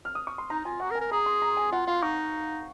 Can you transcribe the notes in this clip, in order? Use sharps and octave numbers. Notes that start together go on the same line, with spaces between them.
F6
D#6
C#6
C6
D#4 A#5
F4 G#5
F#4 F#5
A#4
G#5
A#4
G#4 A#5
C6
A#5
G#5
F4 F#5
F4 F5
D#4 C#6